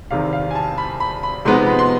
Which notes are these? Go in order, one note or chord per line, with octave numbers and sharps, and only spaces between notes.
E2 C3 D#3 F5
F5
G#5
A5
B5
B5
B5
C3 F3 G#3 B3 D#4 C6
B5
C6